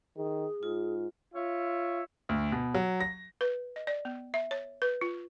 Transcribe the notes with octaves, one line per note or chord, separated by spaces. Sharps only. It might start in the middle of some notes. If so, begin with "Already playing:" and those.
D#3 G#4
G#2 F4
F4 C#5 E5
D2
B2
F#3
A#6
B4
D#5
D5
B3
E5
C#5
B4
F4